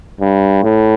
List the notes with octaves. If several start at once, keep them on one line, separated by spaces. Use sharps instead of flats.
G2
A2